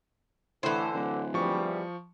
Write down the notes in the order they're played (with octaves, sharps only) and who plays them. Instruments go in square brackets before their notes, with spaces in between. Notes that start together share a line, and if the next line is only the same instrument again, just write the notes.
[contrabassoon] A2 [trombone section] D3 [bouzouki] E3 C5
[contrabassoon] D1
[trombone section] E2 G3 [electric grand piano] F3 C#6